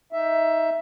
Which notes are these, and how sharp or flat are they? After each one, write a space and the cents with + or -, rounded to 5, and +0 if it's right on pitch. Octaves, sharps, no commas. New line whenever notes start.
D#4 +20 E5 +10